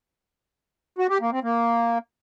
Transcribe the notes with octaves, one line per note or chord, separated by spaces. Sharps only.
F#4
G4
A#3
C4
A#3